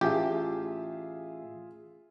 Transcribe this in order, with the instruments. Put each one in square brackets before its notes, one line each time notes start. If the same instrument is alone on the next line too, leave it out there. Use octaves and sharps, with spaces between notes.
[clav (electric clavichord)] A1 G4 [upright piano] F4 G#4 E5